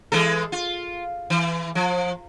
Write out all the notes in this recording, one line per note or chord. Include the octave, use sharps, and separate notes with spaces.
E3 G#3 A4
F4
E3
F3